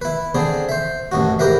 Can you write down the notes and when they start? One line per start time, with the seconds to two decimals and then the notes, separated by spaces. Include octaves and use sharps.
0.01 E4 B4
0.35 D3 C4 G#4
0.69 C5 E5
1.12 A1 F#2 F#4
1.39 G#2 G4 A#4 B4 E5